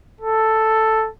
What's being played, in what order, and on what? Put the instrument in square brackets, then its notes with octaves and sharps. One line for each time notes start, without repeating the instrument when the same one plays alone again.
[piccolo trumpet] A4